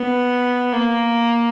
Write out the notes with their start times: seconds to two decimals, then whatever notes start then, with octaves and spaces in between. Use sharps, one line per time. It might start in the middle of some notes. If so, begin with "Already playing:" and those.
Already playing: B3
0.73 A#3